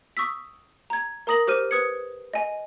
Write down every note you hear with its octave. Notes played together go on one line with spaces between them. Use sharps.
C#6 D#6 E6 B6
A#5 G#6
A#4 A#5 D#6 A#6 F#7
G4 C5 F6 D#7
B4 D#6 G#6 C#7
D#5 G#5